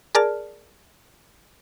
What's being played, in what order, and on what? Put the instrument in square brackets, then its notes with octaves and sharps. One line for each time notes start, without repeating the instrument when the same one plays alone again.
[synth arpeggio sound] G#4 A#4 D5 A5 F6